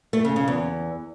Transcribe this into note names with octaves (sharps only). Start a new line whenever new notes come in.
A3
C#3
C#3
E2